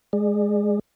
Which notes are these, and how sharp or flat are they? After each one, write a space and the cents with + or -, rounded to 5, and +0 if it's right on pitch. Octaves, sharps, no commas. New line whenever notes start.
G#3 +0 G#4 +0 D5 +40